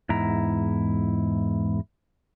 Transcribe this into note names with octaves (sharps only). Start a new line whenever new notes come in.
E2 G#2 E4 A#5